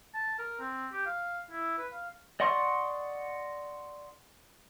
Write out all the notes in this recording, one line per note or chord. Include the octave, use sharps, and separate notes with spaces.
A5
A#4
C4
G4
F5
E4
B4
F5
D5 D#5 F#5 C6 C#6